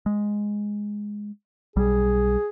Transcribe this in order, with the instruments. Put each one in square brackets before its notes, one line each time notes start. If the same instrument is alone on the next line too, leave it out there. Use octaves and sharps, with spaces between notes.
[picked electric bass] G#3
[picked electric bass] B1 G3 [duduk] G#4